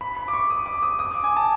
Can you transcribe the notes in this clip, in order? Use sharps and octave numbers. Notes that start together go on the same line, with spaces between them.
B5
B5
D6
C#6
D#6
D6
D#6
D#6
D6
G#5
A5